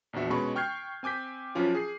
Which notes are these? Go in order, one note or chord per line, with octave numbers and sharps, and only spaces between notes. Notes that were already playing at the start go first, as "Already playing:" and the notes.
A#1 E2 D4 F#4 E5
B2 G#3 C#4 B4 B5 C#6
G5 C#6 F6 G6 G#6 C7
C4 G#5 D6 G6 B6
F#2 F3 C#4 F4
G#4 C7